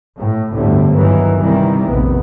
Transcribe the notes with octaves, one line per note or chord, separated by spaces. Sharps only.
A2
G1 D2 A2 D3 G3 A3
G2 D#3 E3 F#3
C3 D#3 E3 G3
F1 A#1 A#2 B3